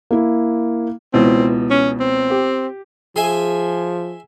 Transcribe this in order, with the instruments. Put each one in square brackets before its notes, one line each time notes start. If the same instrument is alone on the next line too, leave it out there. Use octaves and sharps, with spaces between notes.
[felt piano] A#3 E4
[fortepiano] C#2 B2 E3 [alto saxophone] C4
[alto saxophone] C#4
C4
[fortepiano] G4
[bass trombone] F3 [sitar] G#4 [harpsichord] E5 G#5 C6